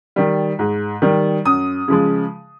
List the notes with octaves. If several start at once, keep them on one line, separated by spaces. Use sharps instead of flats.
D#3 G3
G#2
D#3 G3
F#2 D#6
C#3 F3 G#3